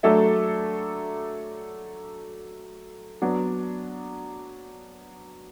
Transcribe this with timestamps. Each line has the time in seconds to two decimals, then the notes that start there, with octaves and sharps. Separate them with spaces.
0.03 F#3 A3 D4 A4 E5
3.22 F#3 B3 D4